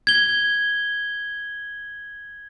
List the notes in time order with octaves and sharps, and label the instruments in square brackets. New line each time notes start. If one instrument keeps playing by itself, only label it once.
[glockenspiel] G#6 G7